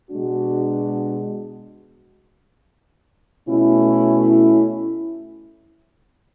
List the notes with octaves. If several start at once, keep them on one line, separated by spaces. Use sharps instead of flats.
B2 G#3 D4 F#4
B2 A3 C#4 E4